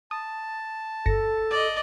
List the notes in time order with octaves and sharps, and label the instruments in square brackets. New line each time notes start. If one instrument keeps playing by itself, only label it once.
[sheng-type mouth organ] A5 [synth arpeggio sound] D#6
[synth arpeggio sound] G1 A#6 C#7 [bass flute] A4
[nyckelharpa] D5 D#5